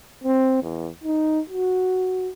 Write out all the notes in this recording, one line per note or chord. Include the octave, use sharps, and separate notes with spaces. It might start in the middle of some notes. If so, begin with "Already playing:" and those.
C4
E2
D#4
F#4